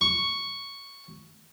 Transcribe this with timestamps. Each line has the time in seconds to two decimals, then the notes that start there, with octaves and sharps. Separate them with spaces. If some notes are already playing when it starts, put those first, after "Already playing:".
0.01 C#6